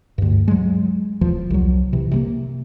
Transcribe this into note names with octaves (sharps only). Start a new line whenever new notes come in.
D2 G2
F#3 G#3
E1 E2 F3
C2 F#3
C3 E3
C3 G3 A#3